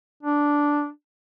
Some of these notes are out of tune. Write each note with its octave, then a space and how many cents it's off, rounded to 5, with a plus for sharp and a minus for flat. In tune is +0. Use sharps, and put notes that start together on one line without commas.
D4 -5